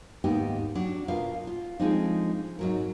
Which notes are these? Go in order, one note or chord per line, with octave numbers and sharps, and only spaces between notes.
D#2 G#2 B3 D#4 G4 G5
F#3 D4
B2 F4 A#4 B4 F5
F4
F3 G#3 A3 C4 D4 D#4
G#2 F#3 A#4